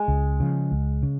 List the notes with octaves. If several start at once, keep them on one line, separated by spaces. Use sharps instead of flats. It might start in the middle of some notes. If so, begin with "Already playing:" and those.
Already playing: G#3
C#2
C#3 F3
C#2
C#3